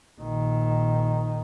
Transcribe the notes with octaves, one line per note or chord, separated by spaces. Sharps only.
A#1 D#3